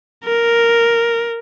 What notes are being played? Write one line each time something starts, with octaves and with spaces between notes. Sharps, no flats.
A#4